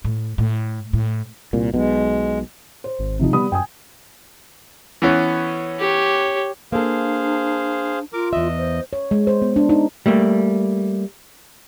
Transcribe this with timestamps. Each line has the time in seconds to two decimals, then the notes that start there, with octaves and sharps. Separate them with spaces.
0.04 A2
0.38 A2
0.93 A2
1.53 C2 A#2
1.74 B1 B2 G#3
2.84 C5
2.99 G#1
3.19 C3 F3 D#4
3.33 G3 B3 B5 D#6
3.52 F#2 G5 G#5 D#6
5.02 E3 B3 C#4
5.79 G4 C#5
6.72 A#3 D4 G#4 A4 C5 F5
8.13 F4 A#4 D6
8.33 E2 D#5 E5
8.58 C5
8.93 C#5
9.11 G#3
9.27 C5
9.42 B3
9.56 D4
9.69 D#4
10.06 G3 A3 A#3